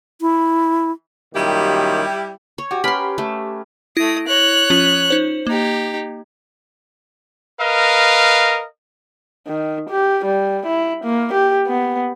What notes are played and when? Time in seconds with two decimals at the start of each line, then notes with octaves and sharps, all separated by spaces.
0.21 E4
1.34 F#2 A#2 D#3 G3 E4 G4
2.58 C#5
2.71 F#4 G4
2.84 C#4 G4 A#4 B4 B5 C6
3.18 A3
3.97 A3 E4 D#6 A#6
4.27 C#5 F#6
4.70 F3 C#4 F4
5.09 D#4 C5 F#7
5.47 A#3 D#4 G4
7.60 A#4 B4 D#5 F5
9.47 D#3
9.90 G4
10.25 G3
10.67 E4
11.05 A#3
11.33 G4
11.67 B3